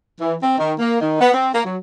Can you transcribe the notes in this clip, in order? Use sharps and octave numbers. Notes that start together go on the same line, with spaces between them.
E3
C4
D#3
A#3
D#3
B3
C4
A#3
F#3